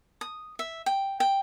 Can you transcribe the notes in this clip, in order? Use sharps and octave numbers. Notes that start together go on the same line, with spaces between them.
D#6
E5
G5
G5